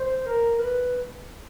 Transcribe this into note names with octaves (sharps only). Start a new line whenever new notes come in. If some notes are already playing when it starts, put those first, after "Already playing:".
Already playing: C5
A#4
B4